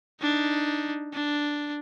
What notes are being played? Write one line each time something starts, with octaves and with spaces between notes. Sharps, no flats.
D4 D#4
D4